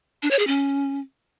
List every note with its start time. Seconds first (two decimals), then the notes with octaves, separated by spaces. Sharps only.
0.23 D4
0.31 C#5
0.39 G#4
0.47 C#4